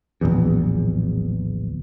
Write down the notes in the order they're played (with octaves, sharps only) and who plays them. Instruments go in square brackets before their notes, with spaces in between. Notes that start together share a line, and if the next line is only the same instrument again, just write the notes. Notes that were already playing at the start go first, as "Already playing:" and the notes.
[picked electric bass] D1 A#1 E2